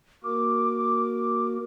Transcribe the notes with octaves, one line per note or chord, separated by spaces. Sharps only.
A#3 F#4 A#4 D6